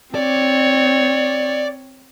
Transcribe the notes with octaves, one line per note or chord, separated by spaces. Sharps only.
C4 C#5 D5